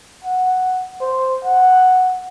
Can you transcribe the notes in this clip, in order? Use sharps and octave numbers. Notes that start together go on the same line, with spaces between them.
F#5
C5
F#5